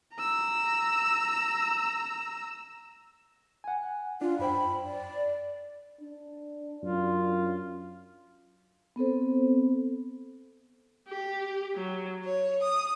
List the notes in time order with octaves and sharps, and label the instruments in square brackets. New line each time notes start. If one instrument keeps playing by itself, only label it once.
[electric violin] A#5 E6
[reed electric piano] F#5 G#5
[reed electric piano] D4 [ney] F4
[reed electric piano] F#2 C5 G5 [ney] B5
[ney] D5
[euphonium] D4
[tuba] F#2 [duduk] F4
[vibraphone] B3 C4 A4 C5
[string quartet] G4
F#3
C#5
D#6